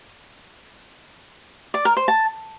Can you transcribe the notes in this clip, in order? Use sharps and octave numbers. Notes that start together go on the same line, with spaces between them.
D5
A#4
C5
A5